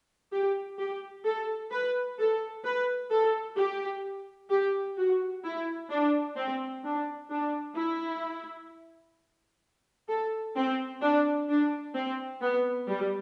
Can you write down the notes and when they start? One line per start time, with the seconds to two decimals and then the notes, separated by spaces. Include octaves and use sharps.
0.32 G4
0.79 G4
1.25 A4
1.71 B4
2.19 A4
2.64 B4
3.11 A4
3.57 G4
4.50 G4
4.98 F#4
5.44 E4
5.90 D4
6.37 C4
6.84 D4
7.30 D4
7.77 E4
10.09 A4
10.56 C4
11.02 D4
11.49 D4
11.95 C4
12.42 B3
12.89 G3